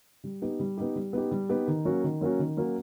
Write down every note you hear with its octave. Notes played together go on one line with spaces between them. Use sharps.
G3
B3 D#4 G4
G3
B3 D#4 G4
G3
B3 D#4 G4
G3
B3 D#4 G4
D#3
F#3 A#3 C#4 F#4
D#3
F#3 A#3 C#4 F#4
D#3
F#3 A#3 C#4 F#4